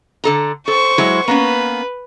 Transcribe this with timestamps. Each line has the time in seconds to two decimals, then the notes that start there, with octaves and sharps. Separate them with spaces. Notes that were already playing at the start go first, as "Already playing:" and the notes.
0.24 D3 A4 A#5
0.68 A4 C5 C#6
0.98 F#3 G#3 E4
1.28 A#3 B3 C#4 B4